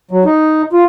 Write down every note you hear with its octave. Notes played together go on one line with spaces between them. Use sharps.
F#3
D#4
F4